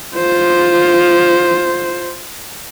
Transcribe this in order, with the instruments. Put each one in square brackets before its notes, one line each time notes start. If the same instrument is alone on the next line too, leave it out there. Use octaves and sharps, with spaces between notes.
[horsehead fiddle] F4 C5